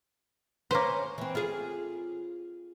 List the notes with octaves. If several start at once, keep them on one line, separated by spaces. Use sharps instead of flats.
A#3 C#4 B4 C5
E3 C4
F4 G#4